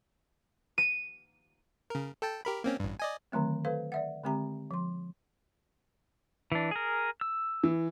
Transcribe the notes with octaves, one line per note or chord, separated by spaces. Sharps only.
D#7
C#3 A#4
A4 G5 A5
G4 A#4 B5
A#3 C4 C#4
A1 G2
D5 D#5 G#5
D3 D#3 F#3 A3 C4
A4 B4 C5 F5
D5 E5 F#5
D3 G#3 C4 G4 A#5
F3 C6
E3 D4
G#4 A#4
E6
E3